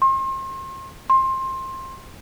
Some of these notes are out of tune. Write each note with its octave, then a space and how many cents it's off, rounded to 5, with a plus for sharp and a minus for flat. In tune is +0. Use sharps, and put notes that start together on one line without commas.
C6 +40
C6 +20